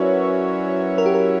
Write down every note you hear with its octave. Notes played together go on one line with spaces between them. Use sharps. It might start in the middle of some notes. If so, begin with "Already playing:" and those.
Already playing: F#3 C#4 E4 F#4 A#4 B4 C#5 D5
A#4
G4
A#4